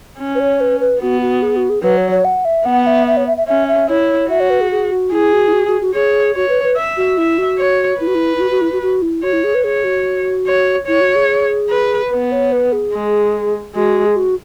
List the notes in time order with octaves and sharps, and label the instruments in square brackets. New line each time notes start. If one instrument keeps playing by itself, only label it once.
[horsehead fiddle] C#4
[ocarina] B4
C#5
B4
B4
[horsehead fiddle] B3 [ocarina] F#4
[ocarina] F#4
G#4
F#4
G#4
[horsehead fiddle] F#3 [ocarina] B4
[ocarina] C#5
C#5
F#5
E5
[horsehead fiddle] B3 [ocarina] F#5
[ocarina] E5
E5
C#5
E5
E5
[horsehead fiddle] C#4 [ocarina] E5
[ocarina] E5
[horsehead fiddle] E4 [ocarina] C#5
[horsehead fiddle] F#4 [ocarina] E5
[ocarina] C#5
B4
G#4
G#4
F#4
[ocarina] E4 [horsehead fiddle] G#4
[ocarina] F#4
E4
F#4
F#4
F#4
[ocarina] G#4 [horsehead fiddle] C#5
[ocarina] F#4 [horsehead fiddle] C#5
[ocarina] B4
B4
[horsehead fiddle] E5
[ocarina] F#4
[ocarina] E4 [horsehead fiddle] E5
[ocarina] F#4
[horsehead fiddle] C#5
[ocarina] E4 [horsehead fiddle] B4
[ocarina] F#4
E4
E4
F#4
F#4
E4
F#4
F#4
E4
[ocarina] F#4 [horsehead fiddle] C#5
[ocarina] E4
G#4
B4
[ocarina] G#4 [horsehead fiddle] C#5
[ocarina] F#4
[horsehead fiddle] C#5
[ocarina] E4 [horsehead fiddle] C#5
[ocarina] F#4
G#4
[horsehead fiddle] B4
[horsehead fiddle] B3 [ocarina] B4
[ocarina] C#5
B4
G#4
[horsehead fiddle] G#3
[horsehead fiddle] G#3 [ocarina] F#4
[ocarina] G#4
F#4